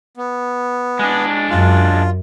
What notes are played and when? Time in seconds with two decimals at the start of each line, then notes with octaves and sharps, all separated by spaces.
0.17 B3
0.99 G#3 D4
1.50 F#2 F4